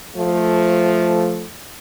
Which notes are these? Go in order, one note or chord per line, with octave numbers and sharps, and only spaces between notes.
F3 A3